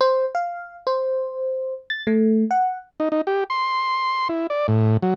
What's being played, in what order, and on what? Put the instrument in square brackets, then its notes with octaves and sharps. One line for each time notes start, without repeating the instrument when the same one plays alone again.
[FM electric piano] C5
F5
C5
A6
A3
F#5
[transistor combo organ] D#4
D#4
G4
C6
E4
D5
A2
F#3